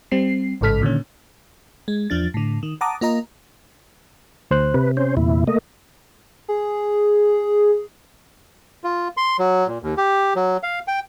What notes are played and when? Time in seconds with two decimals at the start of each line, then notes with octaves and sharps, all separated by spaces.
0.12 G3 C4 C7
0.61 A1 G#2 C#3 A4 F6 B6
0.82 A#2 D3 D#3 C#4
1.88 G#3
2.10 E2 F3 D4 A6
2.34 A2 D3
2.63 D#3
2.81 F#5 A5 A#5 D6 D#6
3.01 A#3 F4 D#5 A#5
4.51 D2 C5 F#6
4.74 C3 B4
4.97 C#4 C5
5.17 E2 A#2 E4
5.47 A3 A#3 D#5
6.48 G#4
8.84 F4
9.17 C6
9.39 F#3
9.67 A#2
9.82 D#2
9.97 G4
10.36 F#3
10.63 F5
10.88 G5